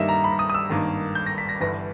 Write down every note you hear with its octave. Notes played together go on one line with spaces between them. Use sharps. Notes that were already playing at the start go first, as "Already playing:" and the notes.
Already playing: G2 D#3 G3 A#3 D#5 E5
A#5
B5
D#6
D#6
E6
G#1 G2 D#3 A#3
G6
A#6
B6
A#6
G1 G2 E3 A#6